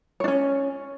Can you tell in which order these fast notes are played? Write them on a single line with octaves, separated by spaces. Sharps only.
C#5 D4 C#4